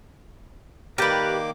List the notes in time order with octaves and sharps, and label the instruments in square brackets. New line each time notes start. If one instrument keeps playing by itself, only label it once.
[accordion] D#3 A#3 D6 [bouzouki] G4 B4 [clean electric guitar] A#4 D5 G5